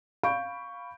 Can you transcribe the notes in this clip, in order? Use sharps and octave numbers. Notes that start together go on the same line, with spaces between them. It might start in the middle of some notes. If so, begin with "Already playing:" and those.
F5 B5 C#6 G6 D7